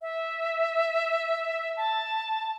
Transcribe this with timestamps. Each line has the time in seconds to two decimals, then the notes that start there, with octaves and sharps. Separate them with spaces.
0.02 E5
1.77 A5